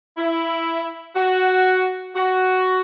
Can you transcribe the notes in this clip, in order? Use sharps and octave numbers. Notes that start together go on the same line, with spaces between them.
E4
F#4
F#4